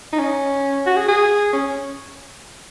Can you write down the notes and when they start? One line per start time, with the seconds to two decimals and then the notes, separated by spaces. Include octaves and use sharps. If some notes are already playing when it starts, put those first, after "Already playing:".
0.13 D#4
0.19 C#4
0.86 F#4
0.97 G#4
1.08 G#4
1.53 C#4